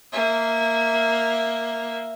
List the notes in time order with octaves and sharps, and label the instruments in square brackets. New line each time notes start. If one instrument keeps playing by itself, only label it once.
[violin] A#3 E5